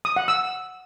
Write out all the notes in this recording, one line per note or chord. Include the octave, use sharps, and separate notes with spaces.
D#6
F#5
E6